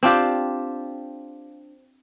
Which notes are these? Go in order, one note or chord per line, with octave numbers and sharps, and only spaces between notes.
C4 D4 F4 G4